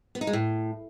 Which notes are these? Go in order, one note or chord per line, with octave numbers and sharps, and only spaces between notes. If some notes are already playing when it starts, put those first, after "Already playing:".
B3
D#4
G#3
A2